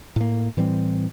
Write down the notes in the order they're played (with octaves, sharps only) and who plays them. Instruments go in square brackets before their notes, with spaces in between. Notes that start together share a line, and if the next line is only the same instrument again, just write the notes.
[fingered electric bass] A2 A#3
A2 E3 G3 C4